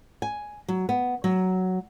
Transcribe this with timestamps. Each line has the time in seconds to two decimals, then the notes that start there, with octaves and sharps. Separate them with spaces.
0.22 G#5
0.68 F#3
0.89 B3
1.24 F#3